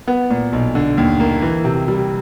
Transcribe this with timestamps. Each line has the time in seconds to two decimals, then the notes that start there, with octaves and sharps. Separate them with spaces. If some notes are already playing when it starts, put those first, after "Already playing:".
0.08 B3
0.30 A#2
0.53 B1
0.75 D3
0.97 D#2
1.20 A#3
1.42 E3
1.65 C3
1.88 G3